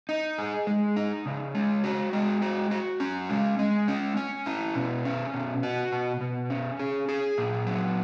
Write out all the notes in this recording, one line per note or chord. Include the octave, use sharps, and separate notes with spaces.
D#4
G#4
G#3
D#4
C#3
G#3
F#4
G#3
F#4
F#4
C#4
G#3
G#3
C#4
C#4
E4
B2
C#4
B2
F#4
B2
B2
C#4
G#4
G#4
A#2
F#3